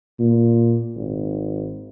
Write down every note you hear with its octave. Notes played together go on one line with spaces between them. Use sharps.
A#2
G#1